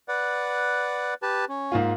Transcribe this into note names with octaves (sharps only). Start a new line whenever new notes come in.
B4 D5 F#5
G4 B4 A5
C#4
G#2 A#3 F4